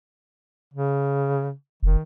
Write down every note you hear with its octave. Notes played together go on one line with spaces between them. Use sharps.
C#3
F1 D#3